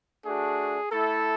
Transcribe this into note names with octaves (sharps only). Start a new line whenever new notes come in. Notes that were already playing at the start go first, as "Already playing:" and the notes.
A3 D4 F#4 G#4
A3 E4 A4